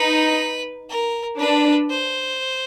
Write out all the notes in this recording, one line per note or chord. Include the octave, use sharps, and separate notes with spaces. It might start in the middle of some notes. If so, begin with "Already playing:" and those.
Already playing: D#4 B4
A#4
D4 B4
C5